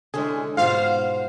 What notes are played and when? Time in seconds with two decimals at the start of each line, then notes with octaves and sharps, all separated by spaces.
0.14 D3 E3 G#3 C#4 G#4
0.57 G#2 B2 F4 C5 F5 F#5